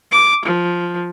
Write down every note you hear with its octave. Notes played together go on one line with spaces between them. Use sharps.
D6
F3